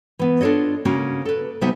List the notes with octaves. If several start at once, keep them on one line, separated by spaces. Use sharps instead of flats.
E3 B3
D4 F4 A4 C#5 D#5
C#3 A#3 C#4 F#4
A4 B4
C3 F#3 B3 D#4 E5 G#5